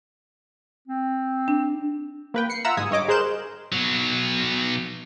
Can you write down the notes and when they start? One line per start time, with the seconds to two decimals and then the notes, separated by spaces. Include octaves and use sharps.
0.88 C4
1.48 D4
2.34 A#3 B4 G5
2.50 C7 C#7
2.65 F4 E5 F#5 A#5 E6
2.77 G1 G#2 G#5 D#6
2.91 G2 C#5 D#5 D6
3.08 G#4 A#4 C5 F#6 G6 E7
3.72 B2 F#3